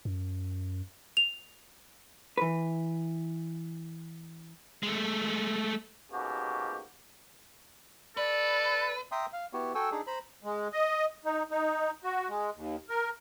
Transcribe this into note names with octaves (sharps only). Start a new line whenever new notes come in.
F#2
F7
E3 B4
G#3 A3
G#2 B2 A#3 C#4 F#4 G4
A4 B4 D5
E5 G5 A#5 C6 D#6
F5
B3 E4 F#4 G4
F#4 A4 G5 G#5 E6
D4 D#4 G#4
C5 A#5 B5
G#3
D#5
D#4
D#4
F#4
G#3
D#2
A#4